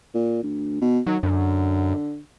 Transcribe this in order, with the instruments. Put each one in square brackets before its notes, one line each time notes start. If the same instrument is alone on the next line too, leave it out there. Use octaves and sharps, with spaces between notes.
[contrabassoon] A#2
D2
B2
[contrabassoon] D#3 [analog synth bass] F#3
[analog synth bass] F#2 [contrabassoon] D3